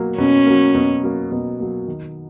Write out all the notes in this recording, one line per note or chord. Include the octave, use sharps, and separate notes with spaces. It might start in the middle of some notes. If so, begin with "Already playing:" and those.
Already playing: B2 F#3 A#3
B2 C#4
F#3 A#3
B2
F#3 A#3
B2
F#3 A#3
D#3